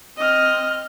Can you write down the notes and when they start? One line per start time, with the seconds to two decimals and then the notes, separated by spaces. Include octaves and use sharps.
0.18 C4 D#5 F6